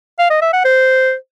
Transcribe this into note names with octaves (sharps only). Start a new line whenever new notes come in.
F5
D#5
E5
F#5
C5